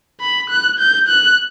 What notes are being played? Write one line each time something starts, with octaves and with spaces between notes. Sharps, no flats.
B5
F#6
G6
F#6